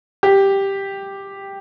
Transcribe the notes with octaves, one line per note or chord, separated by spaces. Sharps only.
G4